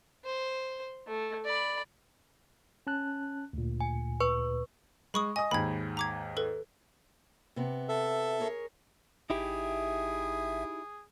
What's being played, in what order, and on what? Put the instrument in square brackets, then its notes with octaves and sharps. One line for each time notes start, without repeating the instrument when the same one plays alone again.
[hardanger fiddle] C5
A3
D5 B5
[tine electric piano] C#4 A5 F#6
D2 A#2
[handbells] G#5
B4 C#6
[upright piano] G#3 [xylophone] B5 C#6 D#6
[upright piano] D#5 D#6 [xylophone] G#5
[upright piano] D#2 G#2 [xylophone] B5 G#6
[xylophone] A#5 D6 G#6
A4 B4
[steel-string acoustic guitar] C3 B3
[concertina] A4 E5
[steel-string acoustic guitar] G#4 A#4 C#5
[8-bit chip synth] G#1 E5 [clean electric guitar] D#4 E4 G4 [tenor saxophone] G#4